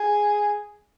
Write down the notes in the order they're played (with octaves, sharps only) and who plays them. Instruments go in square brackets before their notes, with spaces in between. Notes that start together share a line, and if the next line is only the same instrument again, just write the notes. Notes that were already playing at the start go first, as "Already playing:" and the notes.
Already playing: [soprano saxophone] G#4